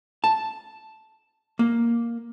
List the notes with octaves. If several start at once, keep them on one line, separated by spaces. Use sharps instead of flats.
A5
A#3